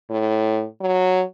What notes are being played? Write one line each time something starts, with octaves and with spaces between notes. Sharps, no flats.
A2
F#3